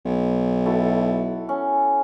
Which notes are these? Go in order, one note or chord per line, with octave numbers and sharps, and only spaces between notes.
B1
E4 F#4 A4
C#4